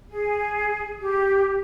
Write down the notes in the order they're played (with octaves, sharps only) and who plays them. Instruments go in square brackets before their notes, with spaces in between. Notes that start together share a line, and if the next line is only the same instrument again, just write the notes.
[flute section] G#4
G4